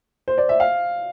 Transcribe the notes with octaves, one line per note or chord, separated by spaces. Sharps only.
C5
D5
E5
F5